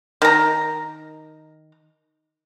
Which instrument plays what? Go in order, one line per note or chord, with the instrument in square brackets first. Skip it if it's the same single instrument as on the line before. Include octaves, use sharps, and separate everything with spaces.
[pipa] D#3 A#5